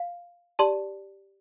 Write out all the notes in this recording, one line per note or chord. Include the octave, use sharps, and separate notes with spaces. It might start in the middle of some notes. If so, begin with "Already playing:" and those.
Already playing: F5
G4 D5 A5 C6